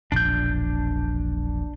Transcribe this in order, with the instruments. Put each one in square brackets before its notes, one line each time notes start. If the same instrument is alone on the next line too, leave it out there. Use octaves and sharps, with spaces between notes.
[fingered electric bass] E1 A#1 [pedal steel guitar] D4 G6